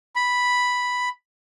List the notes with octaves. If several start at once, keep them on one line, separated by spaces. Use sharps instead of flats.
B5